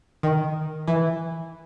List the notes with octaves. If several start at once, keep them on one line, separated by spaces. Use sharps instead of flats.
D#3
E3